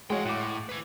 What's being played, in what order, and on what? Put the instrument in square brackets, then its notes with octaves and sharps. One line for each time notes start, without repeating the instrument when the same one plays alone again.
[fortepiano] G#3 F#4 C#5 [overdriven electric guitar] F5 G5
[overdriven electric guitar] A2 [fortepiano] F#5 D6
[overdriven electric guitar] B4 G#5